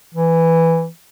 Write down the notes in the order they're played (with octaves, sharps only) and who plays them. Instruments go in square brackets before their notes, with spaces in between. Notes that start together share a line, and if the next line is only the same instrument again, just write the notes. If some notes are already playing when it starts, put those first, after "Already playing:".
[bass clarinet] E3